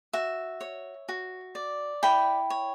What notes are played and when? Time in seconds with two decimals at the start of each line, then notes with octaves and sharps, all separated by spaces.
0.13 F#4 E5
0.61 C#5
1.09 F#4
1.55 D5
2.03 E4 G5 B5
2.50 C#5